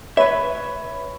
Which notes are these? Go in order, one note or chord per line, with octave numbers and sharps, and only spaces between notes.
B4 C#5 E5 B5